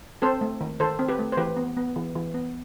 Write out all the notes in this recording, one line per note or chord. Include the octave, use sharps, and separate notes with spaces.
C4 A4 C5
A3
D#3
D#3 A4 C5
C4
G4 B4
A3
C5
E3 G4 B4
B3
B3
E3
E3
B3